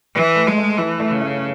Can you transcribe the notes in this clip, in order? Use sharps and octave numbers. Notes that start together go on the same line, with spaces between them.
E3 B4
A3
G#3
A3
E3 E4
A3
C#3
A3